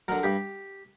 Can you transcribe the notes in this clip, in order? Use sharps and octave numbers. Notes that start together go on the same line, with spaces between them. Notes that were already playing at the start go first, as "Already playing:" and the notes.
D3 F#3 A#4
G2 G4